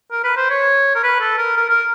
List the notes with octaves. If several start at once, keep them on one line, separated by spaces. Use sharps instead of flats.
A#4
B4
C5
C#5
A#4
B4
A4
A#4
A#4
A#4